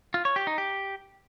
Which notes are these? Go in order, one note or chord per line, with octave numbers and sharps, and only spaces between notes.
F4
C#5
G4
D#4
G4